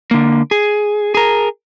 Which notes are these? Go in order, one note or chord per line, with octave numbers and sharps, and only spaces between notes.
D3 A#3
G#4
G#4 A#4